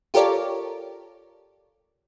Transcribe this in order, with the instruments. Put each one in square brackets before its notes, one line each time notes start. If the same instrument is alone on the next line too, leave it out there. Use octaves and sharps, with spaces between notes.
[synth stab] F4 G4 A4 A#4 C#5 D5